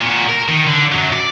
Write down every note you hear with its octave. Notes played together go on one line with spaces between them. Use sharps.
A#2 F#4
A#4
D#3
D3
F#2 F#3
D5